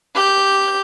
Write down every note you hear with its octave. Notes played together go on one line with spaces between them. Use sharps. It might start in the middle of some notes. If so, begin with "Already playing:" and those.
G4 G6